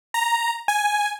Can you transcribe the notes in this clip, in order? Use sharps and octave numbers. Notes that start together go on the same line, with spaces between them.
A#5
G#5